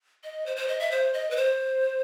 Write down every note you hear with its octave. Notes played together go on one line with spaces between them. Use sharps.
D#5
C5
C5
D#5
E5
C5
D#5
B4
C5